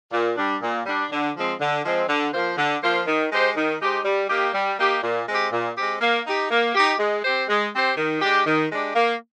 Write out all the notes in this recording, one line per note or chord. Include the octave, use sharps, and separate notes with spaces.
A#2
G3 D4
A#2
G3 D4
D3
F3 G#3 C4
D3
F3 G#3 C4
D3
F3 A#3 F4 C5
D3
F3 A#3 F4 C5
D#3
G#3 D#4 G4 C5
D#3
G#3 D#4 G4 C5
G3
A#3 D#4 G4
G3
A#3 D#4 G4
A#2
G#3 C4 G4
A#2
G#3 C4 G4
A#3
D#4 G4
A#3
D#4 G4
G#3
C4 G4 C5
G#3
C4 G4 C5
D#3
G#3 D4 G4
D#3
G#3 D4 G4
A#3